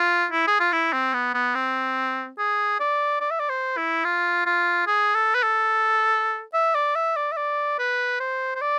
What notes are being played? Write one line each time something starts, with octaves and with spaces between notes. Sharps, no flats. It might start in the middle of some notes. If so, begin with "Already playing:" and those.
Already playing: F4
E4
G#4
F4
E4
C4
B3
B3
C4
G#4
D5
D5
E5
D5
C5
E4
F4
F4
G#4
A4
B4
A4
E5
D5
E5
D5
E5
D5
B4
C5
C5
D5